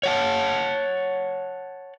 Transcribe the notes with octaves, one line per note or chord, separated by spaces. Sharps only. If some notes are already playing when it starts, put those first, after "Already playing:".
C#5 F#5 A5